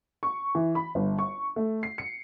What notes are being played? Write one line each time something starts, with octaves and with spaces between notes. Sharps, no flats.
C#6
E3
B5
G1
C#6
A3
C7
C#7